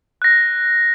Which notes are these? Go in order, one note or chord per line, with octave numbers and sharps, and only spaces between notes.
F#6 A#6